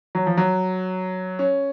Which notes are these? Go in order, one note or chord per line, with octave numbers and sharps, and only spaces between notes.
F#3
F3
F#3
C#4